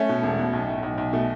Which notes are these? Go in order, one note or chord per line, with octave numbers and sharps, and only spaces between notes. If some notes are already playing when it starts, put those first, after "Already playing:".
Already playing: A3 C#4
B2
E1
B2
B1
A2
B1
B1
B2 A3